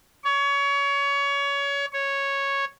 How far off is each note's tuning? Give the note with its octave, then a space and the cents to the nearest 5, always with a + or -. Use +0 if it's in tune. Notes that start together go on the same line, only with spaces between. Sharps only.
C#5 +25
C#5 -5